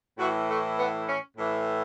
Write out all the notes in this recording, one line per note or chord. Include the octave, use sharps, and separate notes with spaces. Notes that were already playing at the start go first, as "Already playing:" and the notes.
A2 E3 F#4
A3
B3
C#4
A2 E3